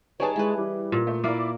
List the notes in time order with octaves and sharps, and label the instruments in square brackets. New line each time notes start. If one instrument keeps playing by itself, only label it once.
[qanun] G3 D#4 G#4 [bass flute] B4 [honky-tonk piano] C#5 G#5 A5
[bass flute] G#3 [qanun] E4 B4
[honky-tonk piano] E3 [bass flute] G3
[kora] A#2
[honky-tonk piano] A3
[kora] A#3 [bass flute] E4 [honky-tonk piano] D5 E5 D6